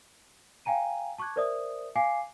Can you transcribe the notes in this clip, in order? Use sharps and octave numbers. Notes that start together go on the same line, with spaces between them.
F5 G5 G#5 A#5 D#7
A5 C#6 D6 F#6 G#6
A#4 C5 D5 E5 D#6
F5 G#5 D6 C7